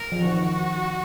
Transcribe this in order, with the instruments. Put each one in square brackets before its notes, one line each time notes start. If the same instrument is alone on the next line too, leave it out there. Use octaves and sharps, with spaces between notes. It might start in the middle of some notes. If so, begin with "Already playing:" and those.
Already playing: [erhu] A#4
[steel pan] F3
[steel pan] D#3 [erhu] F#4